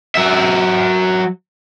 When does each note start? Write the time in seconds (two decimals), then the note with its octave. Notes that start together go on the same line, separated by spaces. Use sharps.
0.15 F#3 E5